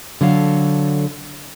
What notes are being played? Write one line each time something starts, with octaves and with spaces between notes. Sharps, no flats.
D3 F#3 A4 F5